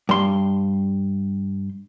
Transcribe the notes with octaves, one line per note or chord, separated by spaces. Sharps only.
G2 C6